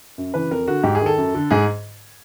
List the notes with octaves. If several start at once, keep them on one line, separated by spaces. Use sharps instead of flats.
F#2
C#3 E3 B4
F2 A#4
D3 F#4
G#2 G4
G#4
D#3
A4
F#2
D3
G#2 G#4